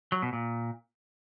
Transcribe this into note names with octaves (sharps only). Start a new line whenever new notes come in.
F#3
B2
A#2